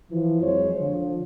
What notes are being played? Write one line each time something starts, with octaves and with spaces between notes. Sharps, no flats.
E3 F3
F2 F#3 G#3 C5 C#5
D3 F3